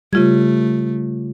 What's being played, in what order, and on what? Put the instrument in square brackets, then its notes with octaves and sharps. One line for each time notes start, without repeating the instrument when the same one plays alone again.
[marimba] C#3 F4 G#6 [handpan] G3 [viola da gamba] A3